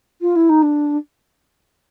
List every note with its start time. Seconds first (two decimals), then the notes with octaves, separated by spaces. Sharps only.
0.21 F4
0.35 E4
0.49 D#4
0.62 D4